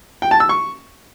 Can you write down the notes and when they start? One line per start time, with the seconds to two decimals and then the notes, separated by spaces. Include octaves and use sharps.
0.22 G5
0.31 A5
0.40 E6
0.49 C#6